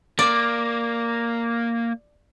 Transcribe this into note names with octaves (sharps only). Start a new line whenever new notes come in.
A#3 D5